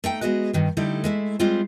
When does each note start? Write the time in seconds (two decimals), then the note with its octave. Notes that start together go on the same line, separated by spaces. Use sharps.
0.04 A3 D#4 G5
0.21 G#3 B3 F#4 G#4 D#5
0.53 G2 D#3 G3
0.77 D3 G3 A3 D#4 E4 G4
1.04 G#3 A3 E4
1.39 G3 G#3 C4 F4 C5